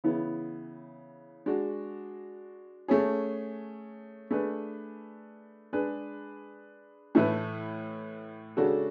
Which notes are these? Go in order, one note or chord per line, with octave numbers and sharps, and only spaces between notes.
C#3 E3 B3 E4
G#3 D4 F#4
A3 C#4 G#4
A3 D4 G#4 B4
G#3 D4 G#4 B4
A2 E3 A3 E4 B4
C#3 G#3 D4 F#4 A4